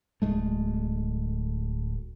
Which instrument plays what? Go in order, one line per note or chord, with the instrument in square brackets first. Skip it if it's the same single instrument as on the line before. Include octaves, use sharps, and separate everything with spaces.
[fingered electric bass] D1 G#3 A3